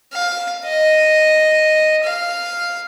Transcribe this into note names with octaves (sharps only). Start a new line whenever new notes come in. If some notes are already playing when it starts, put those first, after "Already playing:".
F5
D#5
F5